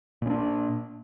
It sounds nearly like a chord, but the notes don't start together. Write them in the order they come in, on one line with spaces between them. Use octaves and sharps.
A#2 C#4 D4